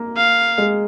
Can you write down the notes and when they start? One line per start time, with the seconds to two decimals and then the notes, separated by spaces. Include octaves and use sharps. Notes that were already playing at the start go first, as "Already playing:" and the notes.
Already playing: A#3
0.17 F5
0.58 G#3